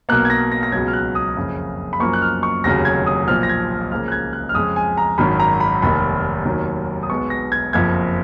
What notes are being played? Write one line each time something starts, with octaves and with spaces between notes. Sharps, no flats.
B1 B2 A#3 F#6
G#6
A#6
A#6
A#6
C#2 B2 F#3 G#6
F6
F#6
D#6
F#1 F2 C#3
B5
F#2 F3 A#3 C#6
F#6
F6
C#6
F1 D#2 C#3 F#3 A#6
G#6
D#6
B1 A#2 F3 F6
A#6
G#6
C#2 C#3 F3 A#3 F6
F#6
G#6
F#6
F6
F2 C#3 G#3 D#6
G#5
A#5
G#1 F#2 D#3 F#3 B5
A#5
B5
F1 D#2 D#3 B5
F1 D#2 D#3 F#3
D#6
B1 B2 G#3 B3 C#6
A#6
G#6
F#1 F2 F3 G#6